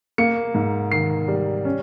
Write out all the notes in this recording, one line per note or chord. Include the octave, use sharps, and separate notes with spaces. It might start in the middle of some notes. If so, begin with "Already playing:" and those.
A#3 C#7
G#2
D#3 C7
G3
C#4